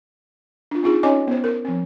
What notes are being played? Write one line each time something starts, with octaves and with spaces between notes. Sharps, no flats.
D4 F4
C4 D#4 F4 G#4
C#4 D#4 C#5 D#5 G#5 D6
B3 C5
A#4
F3 C4